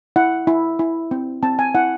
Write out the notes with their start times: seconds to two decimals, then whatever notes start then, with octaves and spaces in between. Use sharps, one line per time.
0.16 E4 F#5
0.47 E4
0.79 E4
1.11 C4
1.43 C4 A5
1.59 G#5
1.75 E4 F#5